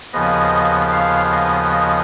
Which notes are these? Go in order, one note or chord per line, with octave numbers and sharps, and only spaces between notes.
D#2 C#3 F3 B3 D#5
F5
D#5
D#5